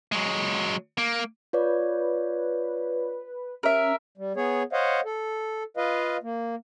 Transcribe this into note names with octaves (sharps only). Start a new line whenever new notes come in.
F#3 G#3
A#3
F4 B4 C#5 D5
C#4 A#4 E5
G3
B3 G#4 C#5
C5 C#5 D#5 F5 F#5
A4
F4 B4 D#5 F5
A#3